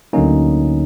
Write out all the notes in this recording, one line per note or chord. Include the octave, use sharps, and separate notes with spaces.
D2 D3 F#3 A#3 C#4 D#4